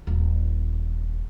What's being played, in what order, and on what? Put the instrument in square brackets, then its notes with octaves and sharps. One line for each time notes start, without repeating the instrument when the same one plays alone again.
[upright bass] D#1 A#3